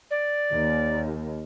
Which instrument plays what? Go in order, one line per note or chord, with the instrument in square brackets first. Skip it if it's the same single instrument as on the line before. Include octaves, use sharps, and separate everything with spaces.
[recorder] D5
[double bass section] D#2